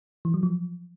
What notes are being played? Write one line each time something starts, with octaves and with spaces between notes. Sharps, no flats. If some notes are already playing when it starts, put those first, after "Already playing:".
E3
F#3
F3